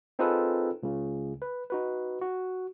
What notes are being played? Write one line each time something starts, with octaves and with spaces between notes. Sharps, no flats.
C4 D#4 F4 G#4 A4 B4
C#2 C#3
B4
D#4 F#4 B4
F#4